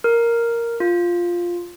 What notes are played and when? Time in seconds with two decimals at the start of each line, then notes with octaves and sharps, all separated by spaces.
0.04 A#4
0.80 F4